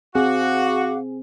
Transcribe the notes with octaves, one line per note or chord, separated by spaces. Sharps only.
C4 F#4 G#4 F5 F#5 D6